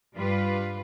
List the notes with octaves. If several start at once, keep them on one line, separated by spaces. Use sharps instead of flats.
G2 G3 F4 B4